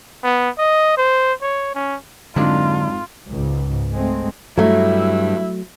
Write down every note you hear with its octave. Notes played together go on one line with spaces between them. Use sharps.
B3
D#5
C5
C#5
C#4
F2 G#2 D3 F#3 G#3 D4 F4
C#2 G#2
G#3 A3 C4
G2 F#3 A3 E4 E5